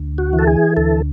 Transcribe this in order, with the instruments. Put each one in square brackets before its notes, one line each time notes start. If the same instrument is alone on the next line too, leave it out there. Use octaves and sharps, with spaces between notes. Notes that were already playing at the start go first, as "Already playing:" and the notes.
Already playing: [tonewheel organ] D2
F#4
E3
A4
G#4
D2 A4